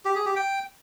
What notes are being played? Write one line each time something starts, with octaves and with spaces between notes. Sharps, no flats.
G4
G#4
G4
G5